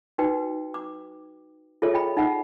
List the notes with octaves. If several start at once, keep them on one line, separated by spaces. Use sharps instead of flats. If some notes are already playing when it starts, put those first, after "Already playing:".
D#4 F#4 B4 G5
D6
F4 G#4 A4 C#5 E5
D#5 G5 B5
D#4 E5 F#5 B5